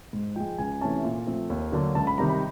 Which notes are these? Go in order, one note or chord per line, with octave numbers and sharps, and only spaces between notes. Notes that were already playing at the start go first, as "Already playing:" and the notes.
G#2
F3 G#3 G5
C#2 G#5
C3 E3 A3 C#4 A5
A#2
F3 A3 C4
D#2
D3 F#3 A#3 D4
C#2 A5
B5
C3 D#3 G3 A#5
B5